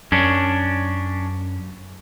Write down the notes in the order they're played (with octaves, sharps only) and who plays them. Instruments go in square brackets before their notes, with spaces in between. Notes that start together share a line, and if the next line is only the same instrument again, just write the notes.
[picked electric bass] F#2 [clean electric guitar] C#4 D4